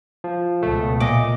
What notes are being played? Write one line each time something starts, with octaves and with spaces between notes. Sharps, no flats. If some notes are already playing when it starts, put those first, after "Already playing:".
F3
C#2 B2 A3
A#2 D#5 D6